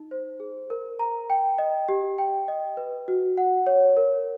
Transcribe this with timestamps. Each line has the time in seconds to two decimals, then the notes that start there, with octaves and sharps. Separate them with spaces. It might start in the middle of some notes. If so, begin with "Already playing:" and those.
Already playing: D#4
0.11 C5
0.40 G#4
0.70 A#4
0.99 A#5
1.30 G5
1.58 D#5
1.89 G4
2.18 G5
2.48 D#5
2.77 B4
3.08 F#4
3.37 F#5
3.67 C#5
3.97 A#4